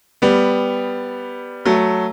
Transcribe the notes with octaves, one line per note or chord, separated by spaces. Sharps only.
G3 B3
F#3 A3